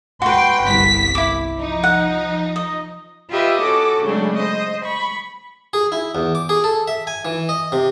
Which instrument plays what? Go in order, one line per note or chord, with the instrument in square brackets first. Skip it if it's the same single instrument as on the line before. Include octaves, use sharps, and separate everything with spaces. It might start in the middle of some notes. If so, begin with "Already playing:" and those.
[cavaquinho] F#4 B4 [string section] G5 C6
[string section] G1 C2 B6
[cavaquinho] E4 D6
[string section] F3 D#4
[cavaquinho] F#5
D#5
[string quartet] F4 G4 B4 D#5 E5
C#4 F#4 A4 D6
C#3 F#3 G#3 A3 C4 D4
C5 D#5
B5 C#6
[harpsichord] G#4
E4
E2
D6
G#4
A4
E5
G#5
E3
D#5
C3